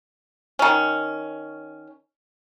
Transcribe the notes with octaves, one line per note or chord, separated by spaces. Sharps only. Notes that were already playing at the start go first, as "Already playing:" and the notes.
D#3 C#4